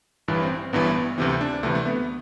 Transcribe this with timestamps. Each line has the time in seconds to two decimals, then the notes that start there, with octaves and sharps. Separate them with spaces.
0.28 A1 G2 E3
0.42 C4
0.73 A1 G2 E3 B3
1.18 D2 C3 E3 C4
1.41 D4
1.63 D2 C3 E3 A3
1.75 A3
1.86 B3